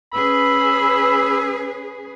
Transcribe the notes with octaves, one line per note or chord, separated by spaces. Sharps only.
C#4 G#4 B4 B5 E6